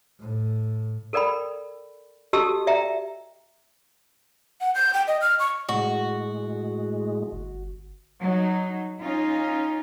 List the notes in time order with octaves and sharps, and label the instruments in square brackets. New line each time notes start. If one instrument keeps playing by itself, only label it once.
[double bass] A2
[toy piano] A4 A#4 D5 G5 B5
F#4 G4 A4 D#5 A5 E6
D5 E5 G5 A#5
[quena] F#5
G6
G5
D#5
F6
C#6
[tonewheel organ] A2 G#3 [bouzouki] F#4
[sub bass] G1
[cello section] F#3 D#4
C#4 D#4 F4